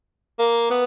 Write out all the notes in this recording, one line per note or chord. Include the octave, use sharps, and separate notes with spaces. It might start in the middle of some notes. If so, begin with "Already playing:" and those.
A#3
B3